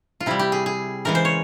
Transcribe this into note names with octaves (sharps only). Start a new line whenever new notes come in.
F4
C3 G3 E4
G4
G#4
G#4
C#3 E3 G#3 A#4
C5
C#5